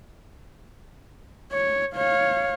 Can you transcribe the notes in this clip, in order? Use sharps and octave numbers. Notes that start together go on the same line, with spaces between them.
C#5
C#5 F5